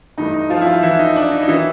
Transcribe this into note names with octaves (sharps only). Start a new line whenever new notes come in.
G2 E3 A3 D#4
D#4
F3 F4
E4
F3 F4
E3 E4
D#4
D4
D#4
D#4
D#3 E3 F#3 E4